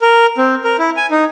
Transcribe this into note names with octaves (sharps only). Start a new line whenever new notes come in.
A#4
C4
A#4
E4
G#5
D#4